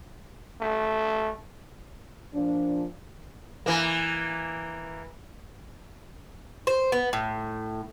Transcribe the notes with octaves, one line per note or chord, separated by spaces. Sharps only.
A3
A#2 F3 D4
E3 A#3
C5
B3
A2